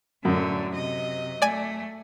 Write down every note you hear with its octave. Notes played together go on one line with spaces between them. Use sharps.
F#2 A2 D3
C3 D#5
A3 D5 G#5 D#7